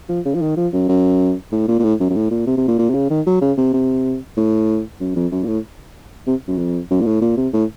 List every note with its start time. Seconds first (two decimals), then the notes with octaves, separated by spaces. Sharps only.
0.09 F3
0.25 C#3
0.34 F3
0.41 D#3
0.57 F3
0.73 F#2
0.89 F#2
1.52 A2
1.68 A#2
1.79 A#2
1.83 A2
2.00 F#2
2.10 F#2
2.15 A2
2.31 A#2
2.46 C3
2.57 C3
2.68 A#2
2.79 A#2
2.90 C3
2.94 C#3
3.10 D#3
3.26 F#3
3.41 C#3
3.58 C3
3.73 C3
4.37 A2
5.00 F#2
5.16 F2
5.32 F#2
5.44 A#2
5.47 A2
6.27 C3
6.48 F#2
6.58 F2
6.90 F#2
7.01 A#2
7.06 A2
7.21 A#2
7.37 C3
7.53 A2